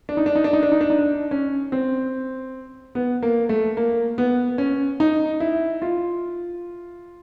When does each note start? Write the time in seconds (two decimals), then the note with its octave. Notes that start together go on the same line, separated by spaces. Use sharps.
0.09 D4
0.17 D#4
0.26 D4
0.36 D#4
0.44 D4
0.53 D#4
0.63 D4
0.72 D#4
0.81 D4
0.90 D#4
0.99 D4
1.31 C#4
1.72 C4
2.95 B3
3.23 A#3
3.49 A3
3.77 A#3
4.18 B3
4.58 C#4
5.00 D#4
5.40 E4
5.82 F4